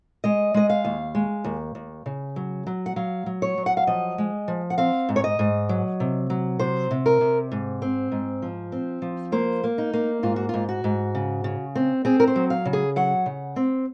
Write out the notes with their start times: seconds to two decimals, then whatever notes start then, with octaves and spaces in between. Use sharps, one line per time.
0.24 G#3 D#5
0.54 G#3 D#5
0.70 F5
0.85 D#2
1.15 G#3
1.44 D#2
1.75 D#2
2.06 C#3
2.36 F#3
2.67 F#3
2.86 F#5
2.96 F#3 F5
3.26 F#3
3.42 C#5
3.58 F#3
3.66 F#5
3.77 F5
3.87 F3 D#5
4.18 G#3
4.48 F3
4.70 F#5
4.78 C4 F5
5.09 G#2
5.16 C#5
5.24 D#5
5.39 G#2
5.69 F#3
6.00 C3
6.30 F#3
6.59 C3 C5
6.91 C3
7.06 A#4
7.21 C3
7.52 G#2
7.82 C4
8.12 G#2
8.42 F3
8.72 C4
9.02 F3
9.32 A#3 C5
9.64 A#3
9.78 D#4
9.93 A#3
10.23 G#2 F4
10.36 F#4
10.49 G#2 F4
10.69 F#4
10.84 G#2
11.15 C#3
11.44 C#3
11.75 C4
12.05 C4 G#4
12.20 A#4
12.28 C5
12.36 F#3
12.50 F5
12.65 C#3
12.73 G#4
12.96 F#3 F#5
13.26 C#3
13.56 C4